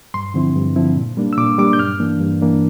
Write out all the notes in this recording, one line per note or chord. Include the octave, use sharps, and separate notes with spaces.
G2 C6
D3 F3 C4 E4
G2
D3 F3 C4 E4
A#2
G3 A#3 D4
E6
A#2 D6
G3 A#3 D4 D6
G6
G2 F6
E3 A#3 D4
G2
E3 A#3 D4